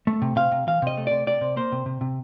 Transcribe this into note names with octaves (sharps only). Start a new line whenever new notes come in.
A3
C3
C3 F5
C3
E3 F5
C3 D#5
A3
C3 D5
C3 D5
C3
A#3 C5
C3
C3
C3